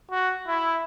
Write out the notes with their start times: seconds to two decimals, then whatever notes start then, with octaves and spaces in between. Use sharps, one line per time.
0.11 F#4
0.47 E4